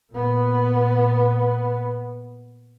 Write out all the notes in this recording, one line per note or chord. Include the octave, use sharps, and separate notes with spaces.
A#2 B3